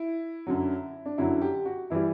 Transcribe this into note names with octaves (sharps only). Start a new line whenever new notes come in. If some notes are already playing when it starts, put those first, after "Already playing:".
Already playing: E4
F#2 D3 F#3
D4
F#2 D3 F#3 E4
G4
F#4
E3 G3 E4